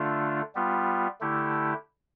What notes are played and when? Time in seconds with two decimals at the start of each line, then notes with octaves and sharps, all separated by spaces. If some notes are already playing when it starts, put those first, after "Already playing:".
Already playing: D3 A3 D4 F4
0.55 G3 B3 F4
1.21 D3 A3 E4 G4